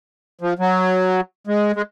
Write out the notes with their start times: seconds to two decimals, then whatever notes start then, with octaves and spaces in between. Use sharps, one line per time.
0.41 F3
0.59 F#3
1.47 G#3
1.76 G#3